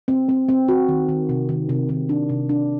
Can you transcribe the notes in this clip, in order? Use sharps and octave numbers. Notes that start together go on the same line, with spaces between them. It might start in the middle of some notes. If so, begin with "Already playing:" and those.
C4
C4
C4
F#4
D#3
D#3
C3
D#3
C3
D#3
D4
C3
D4